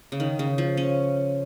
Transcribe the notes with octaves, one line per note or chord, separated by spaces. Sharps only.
C#3
D#3
C#3
F3
C#4